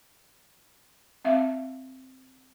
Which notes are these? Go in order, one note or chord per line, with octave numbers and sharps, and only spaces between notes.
C4 E5 F5